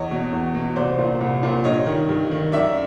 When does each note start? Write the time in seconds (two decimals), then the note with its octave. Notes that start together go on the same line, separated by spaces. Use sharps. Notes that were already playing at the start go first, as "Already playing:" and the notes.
Already playing: E2 C#5 D#5
0.11 B2
0.32 E2
0.55 B2
0.76 C2 C5 D5
0.98 A#2
1.21 C2
1.43 A#2
1.64 G2 C#5 D#5
1.86 D#3
2.09 G2
2.31 D#3
2.52 F#2 D5 E5